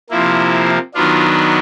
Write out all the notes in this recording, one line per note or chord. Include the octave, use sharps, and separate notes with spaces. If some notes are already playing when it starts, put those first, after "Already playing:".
C3 F3 A#3 E4
D#3 F#3 B3 D4 F4